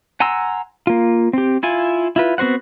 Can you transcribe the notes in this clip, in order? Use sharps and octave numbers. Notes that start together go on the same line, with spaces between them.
F#5 G#5 A#5 C6 E6
A#3 F4
C4 G4
E4 F4 G#5
E4 F4 B4
B3 C4 F#4 C5 F#5